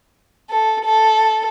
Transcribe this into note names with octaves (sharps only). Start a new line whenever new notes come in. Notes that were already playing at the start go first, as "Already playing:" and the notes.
A4
A4